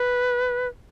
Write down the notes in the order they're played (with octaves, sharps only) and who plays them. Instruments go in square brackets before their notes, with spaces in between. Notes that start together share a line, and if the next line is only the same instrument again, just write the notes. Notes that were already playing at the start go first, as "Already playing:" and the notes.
Already playing: [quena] B4